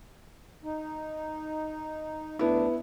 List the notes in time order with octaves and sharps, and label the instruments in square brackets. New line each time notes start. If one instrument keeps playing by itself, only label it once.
[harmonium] D#4
[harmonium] D2 D4 [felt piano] B3 E4